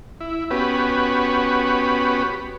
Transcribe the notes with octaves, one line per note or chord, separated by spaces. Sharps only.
E4
B3 C#4 F#4 G4 B4